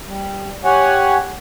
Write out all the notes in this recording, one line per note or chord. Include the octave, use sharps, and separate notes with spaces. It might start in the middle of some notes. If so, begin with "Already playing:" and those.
G3
G4 C#5 F#5 G#5